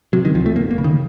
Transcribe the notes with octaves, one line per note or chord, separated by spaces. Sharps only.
C3 F#3
D#3
C#2 F3
A3
F#1 A#3
A#3
C#3
D#3